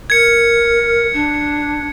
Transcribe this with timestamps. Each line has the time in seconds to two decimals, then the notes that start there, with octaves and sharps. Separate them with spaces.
0.10 A#4 G#6 C#7
1.13 D4